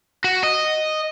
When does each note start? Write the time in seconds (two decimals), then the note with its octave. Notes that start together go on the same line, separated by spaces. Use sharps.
0.24 F#4
0.43 D#5